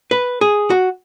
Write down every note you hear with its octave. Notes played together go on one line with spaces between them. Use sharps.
B4
G#4
F#4